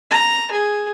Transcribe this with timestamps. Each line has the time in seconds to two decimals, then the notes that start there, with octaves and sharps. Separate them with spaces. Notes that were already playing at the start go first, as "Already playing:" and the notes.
0.11 A#5
0.51 G#4